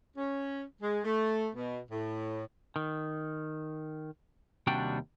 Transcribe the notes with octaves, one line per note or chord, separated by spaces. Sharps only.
C#4
G#3
A3
B2
A2
D#3
D#2 C3 G3 D4 F#4 G5